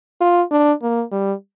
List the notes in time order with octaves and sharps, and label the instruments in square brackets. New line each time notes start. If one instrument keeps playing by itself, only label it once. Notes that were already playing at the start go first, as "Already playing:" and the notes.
[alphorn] F4
D4
A#3
G3